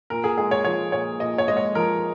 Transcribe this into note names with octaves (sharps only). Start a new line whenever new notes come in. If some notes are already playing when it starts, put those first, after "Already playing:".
A#2 A#4
G#4
G#3 G#4
C#5
F3 C#5
A#2 C#5
A#2 D#5
C#5
G#3 D#5
C#5
F3 A#4